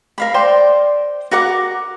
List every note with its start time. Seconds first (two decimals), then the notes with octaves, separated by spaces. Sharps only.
0.18 A#4 F5 B5
0.34 C5 D5 G5 C6
1.31 F#4 A#4 F#5 D6